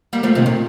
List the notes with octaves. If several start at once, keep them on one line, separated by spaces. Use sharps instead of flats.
G3 A#3
F3 A3
C3 D#3
A#2